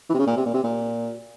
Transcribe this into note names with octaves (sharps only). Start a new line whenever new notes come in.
E3
C3
C#3
A#2
C3
A#2
C3
A#2